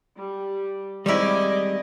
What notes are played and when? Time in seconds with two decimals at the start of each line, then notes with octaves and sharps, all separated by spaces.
0.17 G3
1.06 D#3 G3 G#3 C4 C#4 E4 D5 D#5